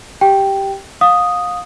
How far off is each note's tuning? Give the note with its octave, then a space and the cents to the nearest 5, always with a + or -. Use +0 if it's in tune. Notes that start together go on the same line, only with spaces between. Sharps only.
G4 -5 G5 +0
F5 +30 D#6 +0